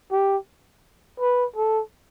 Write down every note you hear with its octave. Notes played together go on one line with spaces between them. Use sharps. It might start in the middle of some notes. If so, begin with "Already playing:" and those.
G4
B4
A4